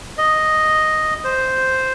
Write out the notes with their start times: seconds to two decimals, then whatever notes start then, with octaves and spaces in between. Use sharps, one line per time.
0.18 D#5
1.24 C5